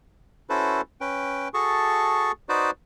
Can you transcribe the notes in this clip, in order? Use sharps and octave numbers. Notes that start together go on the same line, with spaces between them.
C#4 E4 F#4 A4 B4 C5
C#4 B4 G5
F#4 G#4 A4 A5 C#6
D#4 F#4 B4 C5 D5